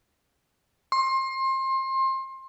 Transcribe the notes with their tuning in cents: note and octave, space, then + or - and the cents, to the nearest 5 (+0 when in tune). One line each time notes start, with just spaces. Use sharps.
C6 +25